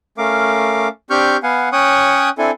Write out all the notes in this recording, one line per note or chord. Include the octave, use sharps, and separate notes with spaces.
A3 C#4 A#4 F5 D6
C4 D4 G4 C#6 F6 G6
B3 F5 F#5 G#5
C#4 C#5 G5 C#6 D#6 F#6
C4 D4 E4 A4 G#5